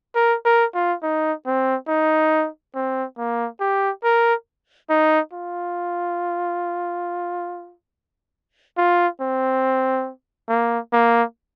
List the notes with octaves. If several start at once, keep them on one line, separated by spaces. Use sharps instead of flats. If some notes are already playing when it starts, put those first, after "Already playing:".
A#4
A#4
F4
D#4
C4
D#4
C4
A#3
G4
A#4
D#4
F4
F4
C4
A#3
A#3